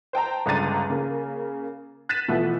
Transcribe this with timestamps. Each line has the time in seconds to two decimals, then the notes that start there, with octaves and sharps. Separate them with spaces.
0.13 C5 G5 A5 A#5
0.46 G1 C#2 D4 A#5 A6 D#7
0.90 C#3 A#3
2.09 F#6 A6 B6 D#7 E7
2.28 B2 E3 F3 A3 B3